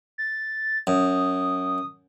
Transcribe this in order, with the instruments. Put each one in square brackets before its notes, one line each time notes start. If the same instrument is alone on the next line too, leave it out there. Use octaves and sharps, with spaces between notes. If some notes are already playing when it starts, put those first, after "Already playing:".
[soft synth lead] A6
[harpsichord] F#2 [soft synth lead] D#6